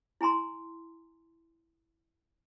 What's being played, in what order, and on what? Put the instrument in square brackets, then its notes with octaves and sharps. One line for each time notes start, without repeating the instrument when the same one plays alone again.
[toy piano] E4 G#5 A#5 C6